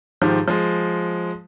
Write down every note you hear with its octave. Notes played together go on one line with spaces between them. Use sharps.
G#2 D#3 F3 G4
F3 G#3